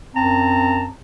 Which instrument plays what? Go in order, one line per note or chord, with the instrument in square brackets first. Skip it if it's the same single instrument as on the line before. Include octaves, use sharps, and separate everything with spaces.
[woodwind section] F#2 C4 A5 A#5